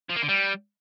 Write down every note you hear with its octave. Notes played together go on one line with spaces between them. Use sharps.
F3
A#3
D3
G3